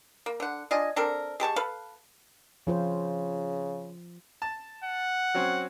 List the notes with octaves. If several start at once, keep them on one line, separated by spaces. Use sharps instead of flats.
A#3
D3 F#5
D4 F4 D#5 G#5
C4 D4 A4 A#4
G#3 G4 A5 C#6
A4 B4 F5
C#3 F3 F4 C5
A5
F#5
F#3 C4 C#4